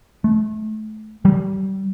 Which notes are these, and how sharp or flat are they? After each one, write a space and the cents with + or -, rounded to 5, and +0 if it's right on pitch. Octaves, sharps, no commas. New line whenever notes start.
A3 -25
G3 -30